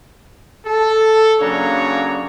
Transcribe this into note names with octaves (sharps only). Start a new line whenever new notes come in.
A4
C#3 F#3 A#3 D4 C#5 A#5